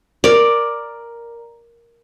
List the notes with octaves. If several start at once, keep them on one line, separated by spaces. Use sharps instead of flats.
A#4 D5